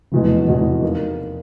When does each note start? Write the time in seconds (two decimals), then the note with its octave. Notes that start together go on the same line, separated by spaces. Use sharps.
0.12 F1 E2 B2 G#3
0.47 F1 E2 B2 G#3
0.83 A#3 D#4